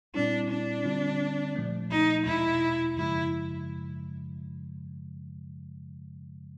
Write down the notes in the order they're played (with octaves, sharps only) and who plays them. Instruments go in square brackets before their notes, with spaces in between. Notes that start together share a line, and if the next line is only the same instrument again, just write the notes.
[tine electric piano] A#2 G3 C4 E4 [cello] D4
[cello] D4
[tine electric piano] D3 G3 C4 F4
A#2 F3 A3
[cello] D#4
[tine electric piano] E2 B2 G#3 [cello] E4
[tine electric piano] F#2 C#3 F3 G#3 [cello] E4